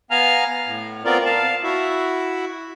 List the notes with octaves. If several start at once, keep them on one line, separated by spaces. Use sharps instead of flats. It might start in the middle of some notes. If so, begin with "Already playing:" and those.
B3 F5 G#5 A#5 F6
A2
B3 C4 F4 A#4 D5
F5 A5
E4 F#4 E5